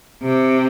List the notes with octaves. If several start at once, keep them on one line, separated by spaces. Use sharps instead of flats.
C3